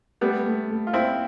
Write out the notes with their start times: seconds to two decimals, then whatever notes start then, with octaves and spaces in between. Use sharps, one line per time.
0.21 G3 A3 B3
0.46 A3
0.70 A3
0.87 F4
0.94 C4 E4 C5